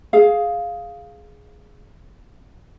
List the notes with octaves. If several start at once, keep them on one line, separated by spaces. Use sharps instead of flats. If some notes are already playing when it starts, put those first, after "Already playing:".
G#4 F5